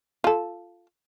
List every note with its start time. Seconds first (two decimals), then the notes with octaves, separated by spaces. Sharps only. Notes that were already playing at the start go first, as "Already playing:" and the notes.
0.24 F4 A4